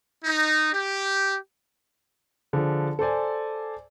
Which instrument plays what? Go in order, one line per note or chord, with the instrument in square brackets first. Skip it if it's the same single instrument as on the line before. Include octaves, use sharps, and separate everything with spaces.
[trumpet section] D#4
G4
[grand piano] D3 F3 G#4
A4 C5 D5 G#5